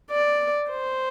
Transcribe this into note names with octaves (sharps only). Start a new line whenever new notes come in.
D5
C5